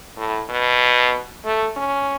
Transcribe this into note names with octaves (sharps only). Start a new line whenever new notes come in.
A2
B2
A3
C#4